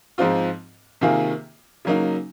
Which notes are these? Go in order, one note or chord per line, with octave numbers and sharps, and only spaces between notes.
G#2 F3 C4 F4
C3 D#3 A#3 F4 G#4
C#3 F#3 A#3 D#4